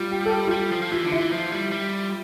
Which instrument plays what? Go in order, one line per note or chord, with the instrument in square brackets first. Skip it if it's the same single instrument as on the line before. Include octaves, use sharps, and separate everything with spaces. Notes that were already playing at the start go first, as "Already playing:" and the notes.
Already playing: [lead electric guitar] G3 [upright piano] F4
[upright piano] G4
A4
G4
F4
[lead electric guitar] G3 [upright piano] G4
[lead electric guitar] F3
F3
[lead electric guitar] E3 [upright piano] F4
[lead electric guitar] D3
[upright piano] E4
[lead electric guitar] E3
F3
G3
G3